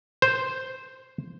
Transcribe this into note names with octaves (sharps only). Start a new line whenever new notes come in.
C5